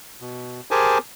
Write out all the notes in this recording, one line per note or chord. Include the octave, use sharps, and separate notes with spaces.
B2
G4 G#4 A#4 C5 G#5 A5